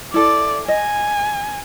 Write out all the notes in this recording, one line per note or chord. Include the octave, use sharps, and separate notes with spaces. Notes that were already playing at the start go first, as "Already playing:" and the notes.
E4 A4 D5
D#5 G#5